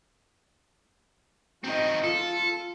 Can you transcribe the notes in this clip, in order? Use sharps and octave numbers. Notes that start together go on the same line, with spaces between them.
D#3 C4 F#4 D#5
F4 A4